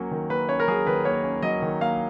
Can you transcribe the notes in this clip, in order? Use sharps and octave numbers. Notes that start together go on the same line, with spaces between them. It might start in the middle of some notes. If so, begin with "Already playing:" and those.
Already playing: F#3 A#3 C#4
D#3
A#3 B4
C#4 C#5
A#4
F#3 G#4
D#3 B4
A#3 C#5
C#4
F#3 D#5
D#3
A#3 F5